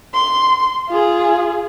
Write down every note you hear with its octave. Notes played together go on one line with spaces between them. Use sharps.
C6
F4 G#4